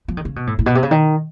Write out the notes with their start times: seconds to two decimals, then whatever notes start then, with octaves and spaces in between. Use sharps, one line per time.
0.08 F3
0.17 D#3
0.25 C#3
0.36 B2
0.47 A2
0.59 A2
0.66 B2
0.75 C3
0.83 C#3
0.91 D#3